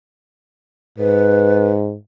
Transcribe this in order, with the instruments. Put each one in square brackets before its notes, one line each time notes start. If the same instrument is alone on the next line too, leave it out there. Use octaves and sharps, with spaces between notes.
[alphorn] G#2 [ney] B4